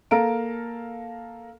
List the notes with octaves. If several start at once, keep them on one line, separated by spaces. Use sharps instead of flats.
A#3 A4 F5 A#5 D7